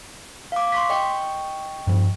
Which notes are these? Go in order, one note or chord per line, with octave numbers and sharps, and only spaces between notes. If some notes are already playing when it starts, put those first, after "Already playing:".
F5 D6
C6 C#6 B6
D#5 G5 C#6
G2 F3